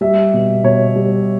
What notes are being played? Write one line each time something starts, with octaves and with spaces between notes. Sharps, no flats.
G3 E5
B2
B2 C#5
G3